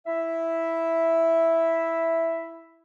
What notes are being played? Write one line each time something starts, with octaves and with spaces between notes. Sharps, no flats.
E4 E5